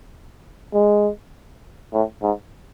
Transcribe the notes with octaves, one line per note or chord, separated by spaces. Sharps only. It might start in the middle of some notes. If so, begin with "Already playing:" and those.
G#3
A2
G#2